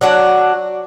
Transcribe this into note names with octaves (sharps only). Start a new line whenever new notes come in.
F#3 D4 F#4